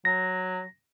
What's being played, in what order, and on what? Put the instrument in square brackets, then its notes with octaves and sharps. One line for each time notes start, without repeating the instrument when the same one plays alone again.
[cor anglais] F#3 [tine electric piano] A#6